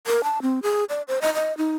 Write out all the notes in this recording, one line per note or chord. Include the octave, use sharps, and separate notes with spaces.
A#4
A5
C4
G#4
D5
C5
D#5
D#5
D#4